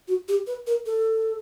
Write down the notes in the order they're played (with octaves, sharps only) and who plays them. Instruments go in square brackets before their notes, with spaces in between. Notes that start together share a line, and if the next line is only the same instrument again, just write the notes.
[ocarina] F#4
G4
B4
A#4
A4